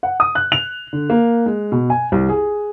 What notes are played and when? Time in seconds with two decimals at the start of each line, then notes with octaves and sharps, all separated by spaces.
0.03 F#5
0.20 D#6
0.35 F#6
0.52 F7
0.93 D3
1.10 A#3
1.46 G#3
1.72 B2
1.90 G#5
2.12 C2
2.29 G#4